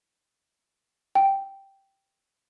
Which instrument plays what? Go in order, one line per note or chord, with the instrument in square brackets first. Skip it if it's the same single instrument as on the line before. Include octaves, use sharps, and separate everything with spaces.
[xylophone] G5